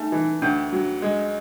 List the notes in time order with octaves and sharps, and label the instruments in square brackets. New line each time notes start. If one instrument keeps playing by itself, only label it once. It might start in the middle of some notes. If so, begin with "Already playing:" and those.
Already playing: [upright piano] G3 A3 [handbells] D#4
[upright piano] E3
[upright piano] D2 [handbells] D4
[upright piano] F#3
G#3